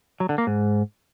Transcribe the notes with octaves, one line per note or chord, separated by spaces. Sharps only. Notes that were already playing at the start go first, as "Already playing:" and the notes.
F#3
D3
A#3
G#2